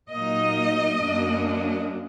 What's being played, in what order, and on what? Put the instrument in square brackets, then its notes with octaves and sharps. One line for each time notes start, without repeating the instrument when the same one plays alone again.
[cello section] A#2 F#3 A#3 D#4 D#5
F#2 F#3 A#3 D4